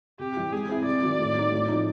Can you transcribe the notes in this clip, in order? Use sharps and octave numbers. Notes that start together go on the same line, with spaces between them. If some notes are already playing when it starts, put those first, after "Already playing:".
C3 G4
E3 G3
G#3 G#4
C4 E4
C3 D5
D#3 F#3
A2
F#3 A#3 D#4
A2
F3 A#3 D#4